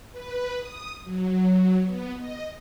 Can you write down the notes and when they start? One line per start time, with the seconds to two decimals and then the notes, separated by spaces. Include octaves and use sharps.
0.12 B4
0.57 D#6
1.04 F#3
1.85 B3
2.18 D#5